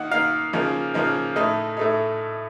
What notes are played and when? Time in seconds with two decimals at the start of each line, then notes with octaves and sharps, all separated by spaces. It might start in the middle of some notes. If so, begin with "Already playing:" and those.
Already playing: D#3 A#3 D#4 F#5
0.11 D#3 A#3 D#4 F5
0.53 C#3 F3 A#3 D#4
0.94 C#3 F3 A#3 D#4
1.36 A2 A3 D#4 D#5
1.77 A2 A3 D#4